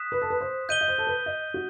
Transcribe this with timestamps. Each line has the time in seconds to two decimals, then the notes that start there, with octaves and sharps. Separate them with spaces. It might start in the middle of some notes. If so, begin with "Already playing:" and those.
Already playing: D#6 F#6 B6 E7
0.12 B4
0.22 A4
0.30 B4
0.41 C5
0.69 D#5 G6 D#7 G7
0.81 D#5
0.88 C5
0.98 A4
1.07 B4
1.26 D#5
1.54 F#4